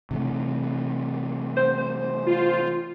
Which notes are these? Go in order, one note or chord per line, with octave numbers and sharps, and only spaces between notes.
C3 E3 A3
C5
C5
F4